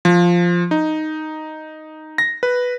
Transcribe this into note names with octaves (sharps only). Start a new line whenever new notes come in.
F3
D#4
A#6
B4